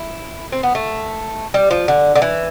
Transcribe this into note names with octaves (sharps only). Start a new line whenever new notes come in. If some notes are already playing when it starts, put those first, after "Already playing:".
Already playing: E4
C4
B3
A3
G3
F3
D3
D3
E3